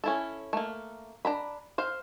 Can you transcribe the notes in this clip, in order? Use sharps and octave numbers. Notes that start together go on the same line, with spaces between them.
C#4 E4 A4
A3 A#3
D4 A#5 B5
C5 F5